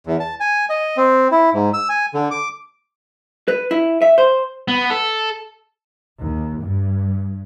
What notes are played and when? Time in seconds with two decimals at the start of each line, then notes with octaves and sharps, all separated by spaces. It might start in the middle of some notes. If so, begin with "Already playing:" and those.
0.07 E2
0.20 A5
0.40 G#5
0.70 D#5
0.97 C4
1.31 E4
1.53 G#2
1.74 E6
1.89 G#5
2.14 D3
2.31 D6
3.48 B4
3.71 E4
4.02 E5
4.18 C5
4.68 B3
4.90 A4
6.20 D#2
6.63 G2